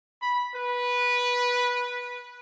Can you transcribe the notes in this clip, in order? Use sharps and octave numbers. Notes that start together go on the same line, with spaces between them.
B5
B4